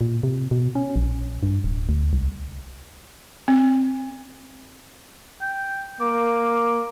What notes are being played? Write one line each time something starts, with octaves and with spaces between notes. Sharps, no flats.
A#2
C3
B2
C#4
A#1
G2
D1
D2
C2
C4
G5
A#3 D6